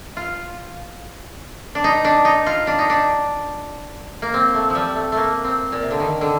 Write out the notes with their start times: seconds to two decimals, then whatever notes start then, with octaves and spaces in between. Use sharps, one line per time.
0.17 F4
1.75 D4
1.84 D#4
2.05 D4
2.25 D#4
2.46 F4
2.67 D4
2.79 D#4
2.90 D4
4.22 A#3
4.34 C4
4.54 A3
4.70 F3 G3
4.95 A3
5.12 A3 A#3
5.44 C4
5.72 A#2
5.82 C3
5.91 D3
6.00 D#3
6.21 D3